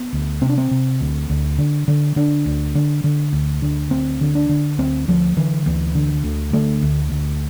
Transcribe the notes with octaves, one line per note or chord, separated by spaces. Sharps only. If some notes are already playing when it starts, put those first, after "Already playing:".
Already playing: B3
D2
C3 C4
D4
C4
C3
D2
D2
D3
D3
D3 D4
D2
D3
D3
D2
D3
D2 C4
D3
D4
D3
D2 C4
D2 F3
D3 E3
D2 E3
D3
D2
D3 A3
D2
D2